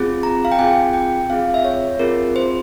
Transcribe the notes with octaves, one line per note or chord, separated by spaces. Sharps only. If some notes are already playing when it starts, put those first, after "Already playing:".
Already playing: C4 F4 G#4
A#5
F5
G5
C4 F4 G#4 G#5
G5
C4 F4 G#4 F5
E5
C#5
C4 F4 G#4 A#4
C5